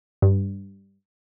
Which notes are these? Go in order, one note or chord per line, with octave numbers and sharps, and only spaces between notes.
G2